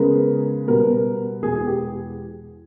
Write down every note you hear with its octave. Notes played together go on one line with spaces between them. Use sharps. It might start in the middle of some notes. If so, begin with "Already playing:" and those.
Already playing: C#3 G#3 B3 A#4
B2 G3 B3 A#4
E2 B2 G#3 B3 G#4
G#4
G4